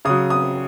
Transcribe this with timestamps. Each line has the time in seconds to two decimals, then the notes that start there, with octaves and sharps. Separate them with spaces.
0.05 C#3 F#3 D#6
0.30 D#6